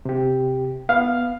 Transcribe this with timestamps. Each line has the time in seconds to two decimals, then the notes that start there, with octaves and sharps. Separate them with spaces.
0.05 C3 G4
0.89 B3 F5